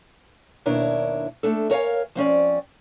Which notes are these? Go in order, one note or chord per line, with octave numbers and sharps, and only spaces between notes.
D#2 B2 D4 E4 A#4 C#5
A3 D4 A4
A#4 C#5 D5 F5 G#5
F3 C4 C#4 D5